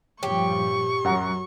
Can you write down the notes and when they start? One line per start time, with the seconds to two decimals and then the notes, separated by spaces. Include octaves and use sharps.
0.23 G2 A#2 F3 G4 C#5 C#6
1.05 F#2 F#3 F#5 A#5